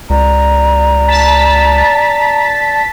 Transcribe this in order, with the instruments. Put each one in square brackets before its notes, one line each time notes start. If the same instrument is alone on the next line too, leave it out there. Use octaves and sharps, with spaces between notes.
[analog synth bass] C#2 [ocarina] D5 [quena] A#5
[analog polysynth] A5 A6 B6